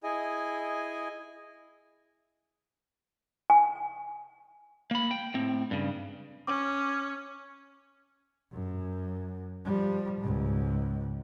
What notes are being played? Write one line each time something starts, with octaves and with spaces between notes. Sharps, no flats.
E4 G#4 D#5 G#5
G#5
A#3 B5
G5
A2 C4
G2 C#3
C#4 D6
F#2
F3 G3
C#2 G#2